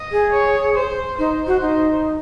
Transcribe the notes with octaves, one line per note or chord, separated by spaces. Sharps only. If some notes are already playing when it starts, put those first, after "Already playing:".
Already playing: D#5
G#4
C#5
C5
D#4 C5
F#4
D#4